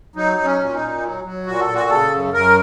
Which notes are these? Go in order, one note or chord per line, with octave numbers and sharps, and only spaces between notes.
F#3 D#4
F#3
C#4
A#2
D#4
A#2
F#3
F#3
A#2 F#4
A4
A#2
F#4
C#3 A4
F#2
F#2 A#4